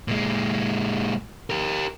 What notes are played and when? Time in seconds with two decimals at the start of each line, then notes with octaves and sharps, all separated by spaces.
0.08 A#2 G#3
1.50 G4 A#4